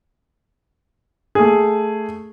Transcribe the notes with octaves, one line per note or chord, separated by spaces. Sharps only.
A3 G#4